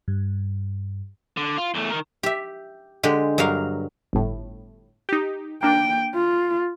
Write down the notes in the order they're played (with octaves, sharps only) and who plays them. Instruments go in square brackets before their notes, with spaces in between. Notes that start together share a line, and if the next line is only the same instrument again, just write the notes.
[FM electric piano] G2
[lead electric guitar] D3
F4
E2 A3
D#3 A#4
[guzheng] G4 E5
D3 G#3 G4
G2 F#3 A#4 F5
[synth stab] G1 A2
D#4 G4
[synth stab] A#3 D4 [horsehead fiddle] G5
[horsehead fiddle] F4